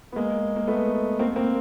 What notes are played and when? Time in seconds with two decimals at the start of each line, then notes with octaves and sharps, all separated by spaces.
0.12 B3
0.16 G#3 A#3
0.56 A#3
0.67 A3 B3
1.19 A#3 C4
1.36 A#3 C4